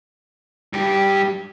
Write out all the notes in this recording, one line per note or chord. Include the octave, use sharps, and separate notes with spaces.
G2 G4